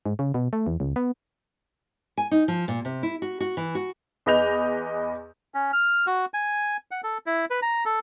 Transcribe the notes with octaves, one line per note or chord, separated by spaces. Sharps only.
G#2
C#3
B2
A3
E2
C#2
B3
G#5
D#4
F3
A#2
C3
E4
F#4
F#4
E3
F#4
E2 B4 D#5 G6 F7
C#4
F6
F#4
G#5
F#5
A4
E4
B4
A#5
A4